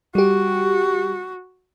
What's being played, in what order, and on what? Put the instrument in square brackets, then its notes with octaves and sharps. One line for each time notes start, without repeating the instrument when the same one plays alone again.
[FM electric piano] G3 G4 [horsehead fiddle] F#4